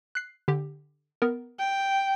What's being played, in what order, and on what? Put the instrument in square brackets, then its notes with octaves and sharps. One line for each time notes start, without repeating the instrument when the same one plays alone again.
[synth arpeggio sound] F#6 C7
D3 G4
B3 A#4
[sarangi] G5